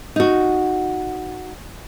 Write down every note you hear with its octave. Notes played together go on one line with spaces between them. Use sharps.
D#4 F#4